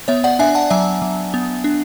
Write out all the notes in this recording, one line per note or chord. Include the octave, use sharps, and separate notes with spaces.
B3 C#5 E5
D5 F#5
D4 E5 G#5
F#5 A5
F#3 E5 G#5
F#3
B3
D4